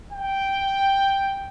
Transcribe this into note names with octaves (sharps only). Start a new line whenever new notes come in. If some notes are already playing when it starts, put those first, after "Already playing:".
G5